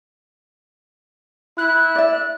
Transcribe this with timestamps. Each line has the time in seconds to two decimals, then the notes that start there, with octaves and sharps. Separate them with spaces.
1.57 E4 F#6
1.95 D5 E5